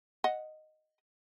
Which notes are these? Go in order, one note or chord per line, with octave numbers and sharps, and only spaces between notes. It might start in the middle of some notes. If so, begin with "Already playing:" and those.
D#5 F#5